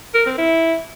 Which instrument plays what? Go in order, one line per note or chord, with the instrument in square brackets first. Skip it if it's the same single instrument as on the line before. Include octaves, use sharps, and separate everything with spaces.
[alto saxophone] A#4
C4
E4